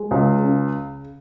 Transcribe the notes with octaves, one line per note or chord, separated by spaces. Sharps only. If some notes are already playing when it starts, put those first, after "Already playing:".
Already playing: G#3
C#2
C#3